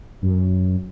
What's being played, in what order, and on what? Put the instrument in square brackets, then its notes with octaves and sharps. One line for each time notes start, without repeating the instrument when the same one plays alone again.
[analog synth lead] F#2